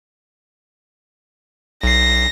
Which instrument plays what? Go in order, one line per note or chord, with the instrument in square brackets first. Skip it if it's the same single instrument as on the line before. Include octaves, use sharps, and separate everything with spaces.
[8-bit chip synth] B1 C7 [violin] A#6